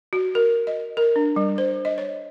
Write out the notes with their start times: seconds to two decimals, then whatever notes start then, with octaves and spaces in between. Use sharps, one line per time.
0.13 F#4
0.35 A#4
0.67 D#5
0.97 A#4
1.16 D4
1.36 G3
1.58 C5
1.85 D#5
1.98 C#5